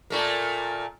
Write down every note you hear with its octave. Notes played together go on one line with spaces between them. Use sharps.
A#2 A3 A#3